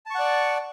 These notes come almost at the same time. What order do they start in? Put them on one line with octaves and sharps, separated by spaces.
A5 C#6 F#5 D5